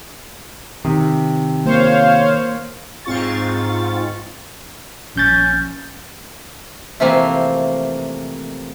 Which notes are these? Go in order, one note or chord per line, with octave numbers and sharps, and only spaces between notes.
C3 D#3
A#3 C5 C#5 F5
G#2 C4 F4 C#6 A6
A#1 C#4 G6 A6
C3 E3 F3 A3 A#3 C4